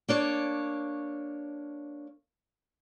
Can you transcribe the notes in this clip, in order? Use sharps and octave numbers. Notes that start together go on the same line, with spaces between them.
A#3 D4 C#5